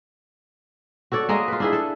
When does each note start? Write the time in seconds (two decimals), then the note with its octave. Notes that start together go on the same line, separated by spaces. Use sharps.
1.12 F#4 A4 C#5 D5
1.29 G#3 A#3 G#4 D#5
1.48 F4 B4
1.60 D4 E4 G#4
1.73 A4